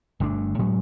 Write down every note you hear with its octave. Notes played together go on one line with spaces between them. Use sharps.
G1 D3 A3 D4
A2 F#3 G#3 C#4